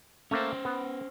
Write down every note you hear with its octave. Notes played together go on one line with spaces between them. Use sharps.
A3 A#3 C#4 C5
B3